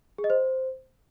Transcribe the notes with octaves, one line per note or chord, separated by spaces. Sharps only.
G#4
D#5
C5